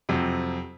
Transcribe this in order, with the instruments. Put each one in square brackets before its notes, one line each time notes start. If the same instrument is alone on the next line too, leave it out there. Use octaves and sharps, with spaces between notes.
[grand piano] F2 C3 F#3